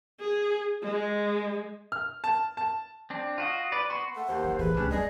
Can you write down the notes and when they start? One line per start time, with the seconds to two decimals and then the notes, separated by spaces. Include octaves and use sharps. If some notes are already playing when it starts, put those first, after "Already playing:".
0.20 G#4
0.83 G#3
1.92 F6
2.24 A5
2.57 A5
3.10 C4 D4
3.38 F4 F#4 D#5
3.72 B4 D5
3.90 B3 F#4 C6 C#6
4.15 A3 F#5
4.27 D#2 C5
4.44 D#3
4.59 A#2 E3 G#4 B4
4.75 C#2 C3 A3 C#4 D4
4.91 G3 G#3 B3 G#4 D5 D#5